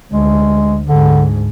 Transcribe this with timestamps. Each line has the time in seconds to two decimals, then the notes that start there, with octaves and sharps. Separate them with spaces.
0.12 D2 G#3
0.88 D2 G#2 D3